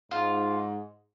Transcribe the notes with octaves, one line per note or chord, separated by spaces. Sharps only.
G#2 F4